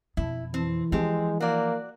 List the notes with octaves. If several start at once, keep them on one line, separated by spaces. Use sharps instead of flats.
F2 B2 E4
E3 C4
F3 G#3 C4 G4
A#3 F#4 D5